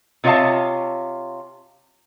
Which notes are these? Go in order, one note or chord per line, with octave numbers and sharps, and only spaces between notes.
C3 F4 C#5 D#5 F5 A5